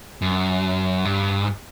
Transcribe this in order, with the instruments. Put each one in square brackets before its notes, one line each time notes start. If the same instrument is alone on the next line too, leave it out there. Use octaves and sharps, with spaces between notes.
[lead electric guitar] F#2
G2